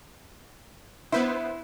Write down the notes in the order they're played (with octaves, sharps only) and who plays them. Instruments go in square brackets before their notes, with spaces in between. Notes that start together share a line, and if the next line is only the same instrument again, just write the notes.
[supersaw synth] B3 B4 C5 [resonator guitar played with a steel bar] E4